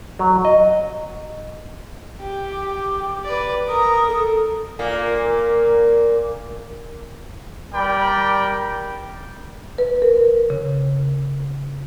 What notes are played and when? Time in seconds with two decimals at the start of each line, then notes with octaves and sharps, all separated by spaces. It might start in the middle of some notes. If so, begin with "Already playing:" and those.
0.19 F#3
0.45 D#5
2.20 G4
2.51 D6
3.24 B4 D5
3.68 A#4 A#5 D#6
4.08 A4
4.79 A#2 A#3
7.74 G3 A#4 D5 G5 B5
9.78 B4
10.02 A#4
10.50 C#3